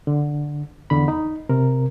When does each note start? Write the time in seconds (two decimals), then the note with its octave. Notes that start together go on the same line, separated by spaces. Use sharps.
0.07 D3
0.90 E2 D3 B5
1.08 D#4
1.49 C3 A#4